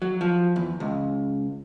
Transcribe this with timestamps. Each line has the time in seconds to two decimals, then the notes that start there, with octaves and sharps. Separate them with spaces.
0.02 F#3
0.21 F3
0.56 E2
0.80 C#2